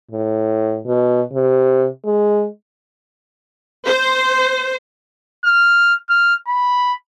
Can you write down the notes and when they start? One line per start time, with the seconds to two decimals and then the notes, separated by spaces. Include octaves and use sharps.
0.11 A2
0.86 B2
1.33 C3
2.05 G#3
3.86 C5
5.45 F6
6.09 F6
6.47 B5